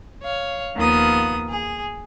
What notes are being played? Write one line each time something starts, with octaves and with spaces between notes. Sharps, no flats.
C#5 F5
D#2 D#3 F3 B3 D#6
G#4